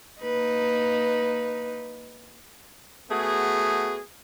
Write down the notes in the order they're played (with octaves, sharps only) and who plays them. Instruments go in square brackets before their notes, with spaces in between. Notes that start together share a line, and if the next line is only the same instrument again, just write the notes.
[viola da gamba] A#3 D#4 B4
[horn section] A3 B3 F#4 G#4